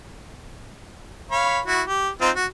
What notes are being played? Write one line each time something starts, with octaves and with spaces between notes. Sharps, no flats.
C#5 F5 B5
E4 F#4
G4
C4 D#4 F4
F#4